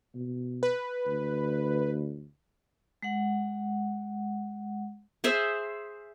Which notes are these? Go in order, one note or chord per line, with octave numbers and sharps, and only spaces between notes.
B2
B4
D2
G#3 F#5
G#4 C5 E5